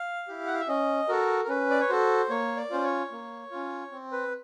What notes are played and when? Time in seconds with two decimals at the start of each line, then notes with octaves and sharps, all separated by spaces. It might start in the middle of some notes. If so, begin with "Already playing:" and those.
Already playing: F5
0.28 E4 G4
0.47 F#5
0.54 F5
0.60 E5
0.68 C#4 D#5
1.09 F#4 A4 A#4
1.44 A#4
1.48 C#4 B4
1.70 D5
1.80 C#5
1.89 F#4 A4 C5
2.30 A#3 C#5
2.57 D5
2.70 C#4 F4 C5
2.84 C#5
3.11 A#3
3.51 C#4 F4
3.92 C4
4.12 B4